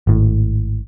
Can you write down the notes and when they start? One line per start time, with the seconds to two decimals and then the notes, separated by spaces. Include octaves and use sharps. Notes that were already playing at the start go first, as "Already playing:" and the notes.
0.07 G#1 A2